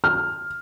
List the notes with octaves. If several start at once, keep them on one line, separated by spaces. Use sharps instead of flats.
F6